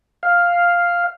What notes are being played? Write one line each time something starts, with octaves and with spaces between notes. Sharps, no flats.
F5